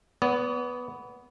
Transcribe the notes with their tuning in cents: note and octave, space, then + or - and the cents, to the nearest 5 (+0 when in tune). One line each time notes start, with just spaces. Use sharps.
B3 +0 D5 -45